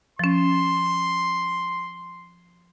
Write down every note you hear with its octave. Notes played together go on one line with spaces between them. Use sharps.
F3 C#4 C6